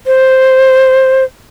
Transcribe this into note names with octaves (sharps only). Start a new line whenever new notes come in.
C5